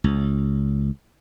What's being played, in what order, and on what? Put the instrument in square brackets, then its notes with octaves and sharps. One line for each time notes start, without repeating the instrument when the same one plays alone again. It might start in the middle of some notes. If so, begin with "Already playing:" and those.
[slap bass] C#2